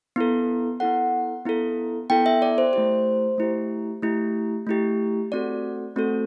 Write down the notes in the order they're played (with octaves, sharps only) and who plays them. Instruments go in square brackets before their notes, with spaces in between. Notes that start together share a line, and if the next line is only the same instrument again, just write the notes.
[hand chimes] B3 E4 A4
B3 E4 A4 F#5
B3 E4 A4
B3 E4 A4 G5
E5
D5
C5
A3 E4 G4 C5
A3 E4 G4
A3 E4 G4
A3 E4 G4
A3 C4 F#4 A4 D5
A3 C4 F#4 A4